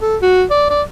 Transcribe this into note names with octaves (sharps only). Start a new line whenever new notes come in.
A4
F#4
D5
D5